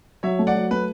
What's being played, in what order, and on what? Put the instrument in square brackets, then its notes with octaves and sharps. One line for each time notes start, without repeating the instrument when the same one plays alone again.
[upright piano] F#3 [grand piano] C#5 E5
[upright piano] A3
[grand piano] D5 F#5
[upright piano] F#3
[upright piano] A3 [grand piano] B4